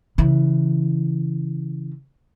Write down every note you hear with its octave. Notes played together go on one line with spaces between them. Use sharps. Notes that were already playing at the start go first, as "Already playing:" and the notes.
C#3 E3